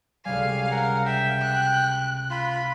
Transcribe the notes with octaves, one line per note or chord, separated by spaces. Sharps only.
C#2 C3 G3 F5 G#5
A#4 F#5
E5 G5
F#6
F4 B5